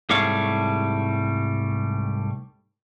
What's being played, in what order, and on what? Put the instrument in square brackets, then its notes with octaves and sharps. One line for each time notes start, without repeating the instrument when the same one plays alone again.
[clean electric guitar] C2 G#2 G3 A3 C#5 F5